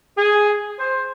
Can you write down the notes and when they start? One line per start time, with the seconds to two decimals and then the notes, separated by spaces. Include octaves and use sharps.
0.16 G#4
0.78 C5